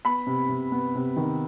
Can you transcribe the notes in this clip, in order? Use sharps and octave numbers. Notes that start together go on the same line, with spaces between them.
B3 B5
C3
C3
B3
C3
D#3